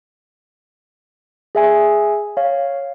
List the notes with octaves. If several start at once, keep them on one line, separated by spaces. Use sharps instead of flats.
G#4 E5 G#5
C#5 F5